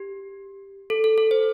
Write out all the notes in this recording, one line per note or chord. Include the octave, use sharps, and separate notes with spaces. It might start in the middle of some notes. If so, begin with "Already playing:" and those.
Already playing: G4
A4
A4
A4
C5